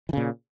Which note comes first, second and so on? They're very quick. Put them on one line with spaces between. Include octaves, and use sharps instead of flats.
E3 C#3 A#2